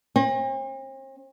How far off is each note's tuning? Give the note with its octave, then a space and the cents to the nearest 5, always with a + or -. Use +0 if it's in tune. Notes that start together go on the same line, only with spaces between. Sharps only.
C4 +45